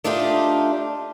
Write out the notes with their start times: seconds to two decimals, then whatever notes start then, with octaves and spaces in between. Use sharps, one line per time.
0.04 A3 D4 D#4 F4 G4